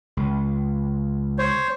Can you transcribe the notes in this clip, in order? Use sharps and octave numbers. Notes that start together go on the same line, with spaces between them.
C#2
C5 C#5